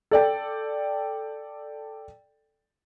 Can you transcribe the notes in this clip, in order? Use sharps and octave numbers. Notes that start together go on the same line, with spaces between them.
A4 D5 G5